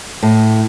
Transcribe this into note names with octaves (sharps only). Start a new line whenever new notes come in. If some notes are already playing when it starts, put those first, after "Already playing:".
A2